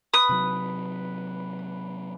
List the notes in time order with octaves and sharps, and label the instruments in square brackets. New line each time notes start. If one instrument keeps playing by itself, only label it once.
[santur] B4 [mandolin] D#6
[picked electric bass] C3 F#3